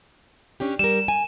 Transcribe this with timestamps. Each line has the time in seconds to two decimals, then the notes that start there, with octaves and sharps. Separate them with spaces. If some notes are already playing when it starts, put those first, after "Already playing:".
0.60 C#4 D4 G4
0.79 G3 A#4 E7
1.08 G#5